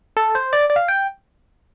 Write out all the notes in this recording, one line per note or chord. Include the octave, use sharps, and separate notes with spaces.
A4
C5
D5
D5
F5
G5